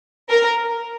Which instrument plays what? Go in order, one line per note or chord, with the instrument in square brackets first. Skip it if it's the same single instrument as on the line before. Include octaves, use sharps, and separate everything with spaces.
[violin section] A#4